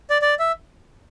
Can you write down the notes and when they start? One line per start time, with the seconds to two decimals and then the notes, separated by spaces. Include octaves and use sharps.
0.10 D5
0.22 D5
0.39 E5